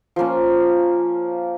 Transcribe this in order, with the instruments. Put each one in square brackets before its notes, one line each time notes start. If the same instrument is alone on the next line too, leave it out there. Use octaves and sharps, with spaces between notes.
[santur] F3 A#3 C#4